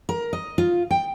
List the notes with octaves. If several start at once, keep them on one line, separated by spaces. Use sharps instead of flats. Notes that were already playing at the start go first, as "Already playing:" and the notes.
A#4
D#5
F4
G5